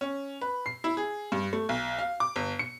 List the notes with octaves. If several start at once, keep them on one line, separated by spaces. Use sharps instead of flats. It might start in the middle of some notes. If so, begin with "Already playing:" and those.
C#4
B4
C7
E4
G#4
G2
A3
B1
F5
D6
G1
C#7